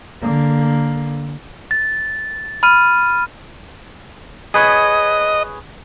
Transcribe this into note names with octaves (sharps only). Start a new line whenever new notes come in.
D3 A#3
A6
B5 F6 D#7
G#4 B4 C#5 D#5